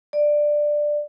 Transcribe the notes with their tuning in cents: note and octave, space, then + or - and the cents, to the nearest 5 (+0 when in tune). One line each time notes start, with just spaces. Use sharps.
D5 +10